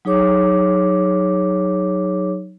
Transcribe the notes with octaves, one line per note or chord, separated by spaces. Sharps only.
F#3 D#4 G#4 C#5 D6